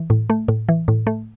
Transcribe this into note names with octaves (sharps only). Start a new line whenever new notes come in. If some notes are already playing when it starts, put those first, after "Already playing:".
Already playing: E3
A2
A3
A2
E3
A2
A3